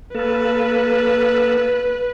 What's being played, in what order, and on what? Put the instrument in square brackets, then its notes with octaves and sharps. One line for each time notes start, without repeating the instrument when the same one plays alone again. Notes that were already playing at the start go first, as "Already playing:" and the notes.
[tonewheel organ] A#3 A4 [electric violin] B4